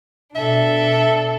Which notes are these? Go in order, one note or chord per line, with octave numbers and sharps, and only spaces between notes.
B2 D4 A4 E5